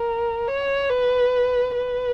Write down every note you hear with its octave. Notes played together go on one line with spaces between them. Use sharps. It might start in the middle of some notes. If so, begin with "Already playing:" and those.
Already playing: A#4
C#5
B4
B4